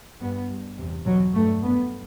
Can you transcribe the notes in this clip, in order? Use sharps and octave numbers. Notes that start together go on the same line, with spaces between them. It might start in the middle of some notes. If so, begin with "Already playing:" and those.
G2 B3
G2
E2 C3
E2 B2 F#3
G2 A3
G2 B3